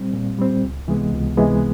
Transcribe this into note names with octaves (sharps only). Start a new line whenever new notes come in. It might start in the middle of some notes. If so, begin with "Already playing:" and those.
Already playing: A#2 G3 C4
A#2
G3 C4
C#2
C3 E3 G#3 B3
C#2
C3 E3 G#3 B3